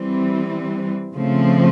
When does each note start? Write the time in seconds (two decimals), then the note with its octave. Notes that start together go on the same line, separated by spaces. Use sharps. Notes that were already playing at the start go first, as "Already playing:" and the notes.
Already playing: E3 G3 C4
1.14 C#3 F3 A3 C4